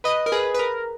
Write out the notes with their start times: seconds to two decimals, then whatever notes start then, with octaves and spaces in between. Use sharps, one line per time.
0.04 B4 D#5
0.26 A#4
0.32 G#4 B4
0.54 B4
0.59 A#4